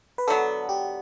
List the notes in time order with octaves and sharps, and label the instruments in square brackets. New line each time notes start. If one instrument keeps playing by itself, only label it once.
[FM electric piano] B4
[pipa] D3 F#3 B3 [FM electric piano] A4
[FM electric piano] G4